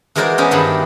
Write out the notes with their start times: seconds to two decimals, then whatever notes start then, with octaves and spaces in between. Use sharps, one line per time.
0.15 E3 G#3 F#4 A#4 C5 D5
0.38 B3 C#4 G#4 A#4 C5
0.51 G2 D#3 D4 E4